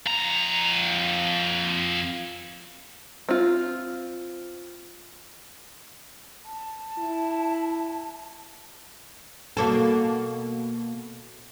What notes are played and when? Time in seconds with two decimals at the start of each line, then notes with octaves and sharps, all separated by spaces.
0.06 F2 A#5
3.29 C4 F4
6.45 A5
6.98 E4
9.57 B2 A#3 A4